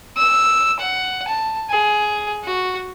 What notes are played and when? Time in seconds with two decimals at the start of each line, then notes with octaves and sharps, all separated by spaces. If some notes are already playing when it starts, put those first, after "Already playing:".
0.17 E6
0.79 F#5
1.28 A5
1.70 G#4
2.44 F#4